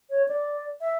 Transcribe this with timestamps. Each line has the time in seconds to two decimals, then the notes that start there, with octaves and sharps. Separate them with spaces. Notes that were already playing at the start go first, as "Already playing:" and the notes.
0.10 C#5
0.28 D5
0.81 E5